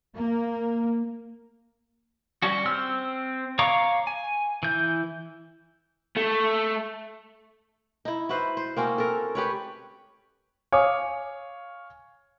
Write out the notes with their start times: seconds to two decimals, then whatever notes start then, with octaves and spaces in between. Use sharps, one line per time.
0.16 A#3
2.42 G3 C#4 F#4
2.66 C4 C5 E6 F6
3.59 C#5 F5 A#5 C#6 D6
4.07 G#5
4.63 E3 G6
6.16 A3
8.05 D#4 E4
8.29 E4 F#4 B4 C5
8.57 C5
8.77 A#3 C4 C#4 F#4
8.98 A4 A#4
9.35 G4 B4 C#5
10.72 C#5 F5 G#5 D6 D#6